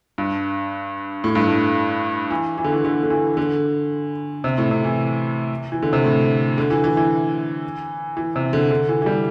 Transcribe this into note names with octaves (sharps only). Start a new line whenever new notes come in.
G2
A2
G2
A2
E3
E3
D3
E3
D3
D3
E3
D3
C3
A2
C3
E3
E3
D3
C3
A2
D3
E3
E3
E3
E3
C3
D3
D3
E3
E3
G3